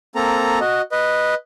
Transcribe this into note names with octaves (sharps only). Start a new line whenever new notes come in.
A#3 C4 A4 A#5
F#4 D#5
B4 D#5